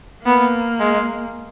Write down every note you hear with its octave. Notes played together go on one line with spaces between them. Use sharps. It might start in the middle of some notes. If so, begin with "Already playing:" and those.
A#3 B3
G#3